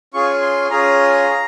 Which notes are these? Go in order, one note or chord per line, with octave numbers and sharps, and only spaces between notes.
C#4 F4 G#4 C#6
C6
C#4 F4 G#4 A#5